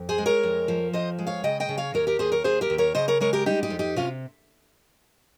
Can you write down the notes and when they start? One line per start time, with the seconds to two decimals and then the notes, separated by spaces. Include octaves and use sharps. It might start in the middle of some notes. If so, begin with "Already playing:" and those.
Already playing: F2
0.09 G#4 C5
0.18 G#3
0.26 A#4 C#5
0.43 F2
0.68 F3
0.93 F2 C5 D#5
1.18 G#3
1.27 C#5 F5
1.44 C#3 D#5 G5
1.60 D#5 G5
1.69 C#3
1.78 C#5 F5
1.94 D#2 A#4 C#5
2.07 G4 A#4
2.19 D#2 G#4 C5
2.32 A#4 C#5
2.44 D#2 G#4 C5
2.61 G4 A#4
2.70 D#2
2.78 A#4 C#5
2.95 C#3 C5 D#5
3.08 A#4 C#5
3.21 G#3 A#4 C#5
3.33 G4 A#4
3.46 G3 D#4 G4
3.63 D#4 G4
3.70 F2
3.79 D#4 G4
3.96 C3 C#4 F4